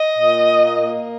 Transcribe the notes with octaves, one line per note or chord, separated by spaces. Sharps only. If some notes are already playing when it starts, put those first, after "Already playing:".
Already playing: D#5
A#2
A#3